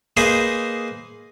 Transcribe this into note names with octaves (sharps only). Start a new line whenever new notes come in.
A#3 D#4 G#4 B4 C5